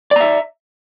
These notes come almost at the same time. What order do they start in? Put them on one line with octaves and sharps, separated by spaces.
D5 A#5 E5